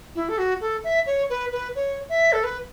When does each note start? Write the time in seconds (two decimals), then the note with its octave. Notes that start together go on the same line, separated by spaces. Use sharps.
0.15 E4
0.29 A4
0.38 F#4
0.61 A4
0.84 E5
1.07 C#5
1.30 B4
1.52 B4
1.75 C#5
2.09 E5
2.32 A4
2.44 B4